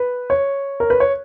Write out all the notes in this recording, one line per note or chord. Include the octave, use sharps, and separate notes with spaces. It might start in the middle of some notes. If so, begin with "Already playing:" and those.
Already playing: B4
C#5
A#4
B4
C#5